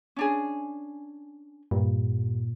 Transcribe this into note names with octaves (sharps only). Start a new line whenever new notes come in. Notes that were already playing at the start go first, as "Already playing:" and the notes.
C#4 D4 G#4
G2 A#2